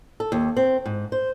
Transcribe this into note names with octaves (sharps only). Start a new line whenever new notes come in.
A4
D#2
C4
G#2
C5